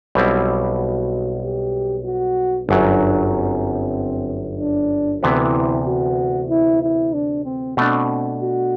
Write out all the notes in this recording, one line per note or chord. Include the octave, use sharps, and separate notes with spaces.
B1 B2 G3 C4 E4
F#4
G4
F#4
G1 F#2 F#3 D4
C4
D4
D2 C3 E3 B3 E4
F#4
E4
E4
D4
C4
B2 A3 C4 D4
F#4